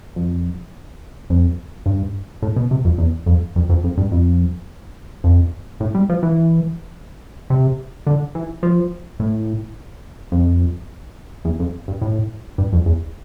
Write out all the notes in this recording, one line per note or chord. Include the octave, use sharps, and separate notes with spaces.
F2
F2
G2
A2
B2
C3
F2
E2
F2
F2
F2
F2
G2
F2
F2
A2
G3
F3
E3
C3
D3
E3
F3
A2
F2
E2
F2
G2
A2
G2
F2
E2